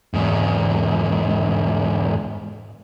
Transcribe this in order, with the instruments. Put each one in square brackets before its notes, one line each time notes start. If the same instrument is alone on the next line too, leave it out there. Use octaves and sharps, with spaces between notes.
[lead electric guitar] E2 G#2